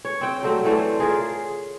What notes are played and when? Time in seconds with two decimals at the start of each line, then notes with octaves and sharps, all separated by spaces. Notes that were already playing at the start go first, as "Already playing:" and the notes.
0.05 C#5
0.21 C4 G5
0.43 F#3 G3 A3 C4
0.64 E3 A3 C5 D5
1.00 C#3 F4 G#4 A#4